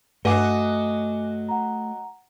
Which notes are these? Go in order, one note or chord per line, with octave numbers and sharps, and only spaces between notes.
G2 F#3 A3 F#4 D#5 F#5 G#5 D6
F#5 A#5